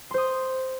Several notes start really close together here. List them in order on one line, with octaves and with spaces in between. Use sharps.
C6 C5 D#6